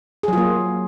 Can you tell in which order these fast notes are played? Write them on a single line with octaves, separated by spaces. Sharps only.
G#4 F#3 F4 A#3